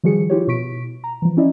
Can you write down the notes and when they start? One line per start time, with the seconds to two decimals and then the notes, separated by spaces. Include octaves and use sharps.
0.03 D#3 F3 G3 F#4 G#4 C#7
0.30 E4 F4 G4 C#5
0.47 B2 E4 C#6 B6 D7
1.04 A#5
1.22 E3 F3
1.37 C#4 E4 D5 D#5